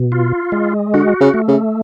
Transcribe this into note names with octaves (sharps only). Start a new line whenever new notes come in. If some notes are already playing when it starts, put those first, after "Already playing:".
Already playing: B2
F4
G#3
D3 F#4
C#3
A3
C#3